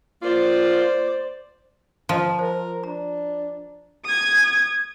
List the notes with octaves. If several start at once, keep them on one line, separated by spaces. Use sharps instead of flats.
A#3 F4 C5 D5
F3 D#5 A#5 C6
A#4 C5
D4 A#5
D#6 G#6